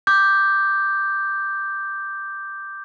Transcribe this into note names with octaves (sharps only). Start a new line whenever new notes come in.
D6 G6